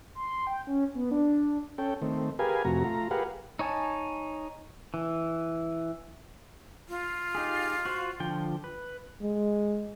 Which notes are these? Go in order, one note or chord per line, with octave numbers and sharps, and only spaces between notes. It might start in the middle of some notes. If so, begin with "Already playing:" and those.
C6
G5
C#4
B3
D4
C#4 A4 G5
D#3 A3 C4
G4 G#4 A#4 B4 F5 G#5
F2 C3 A3 F#4 A#5
A3 F4 A#5
G4 G#4 A#4 B4 F5 F#5
D#4 C#5 G#5 A5
E3
F4
D#4 G4 G#4
F#4 C5
D3 F3 G5
B4
G#3